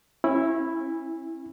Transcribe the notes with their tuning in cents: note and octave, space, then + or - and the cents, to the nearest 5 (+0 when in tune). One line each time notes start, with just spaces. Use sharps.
C#4 -30 E4 +0